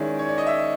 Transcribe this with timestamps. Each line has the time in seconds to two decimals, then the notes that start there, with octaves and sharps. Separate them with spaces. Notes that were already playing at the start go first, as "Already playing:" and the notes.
Already playing: D#3 G#3 C#4 E4 D5
0.19 C#5
0.28 D5
0.38 D#5
0.47 E5